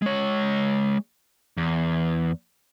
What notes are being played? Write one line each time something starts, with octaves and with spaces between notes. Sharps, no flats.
G#3 C#5
E2